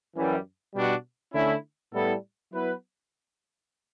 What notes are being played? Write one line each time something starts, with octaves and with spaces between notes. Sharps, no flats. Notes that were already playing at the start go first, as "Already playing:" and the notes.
F#2 E3 G3
B2 G3 D4 F#4
D3 A3 C#4 E4
A2 G3 B3 E4 A4
F#3 B3 E4 B4